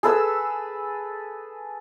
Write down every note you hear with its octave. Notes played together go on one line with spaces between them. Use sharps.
G#4 A4 B4 E6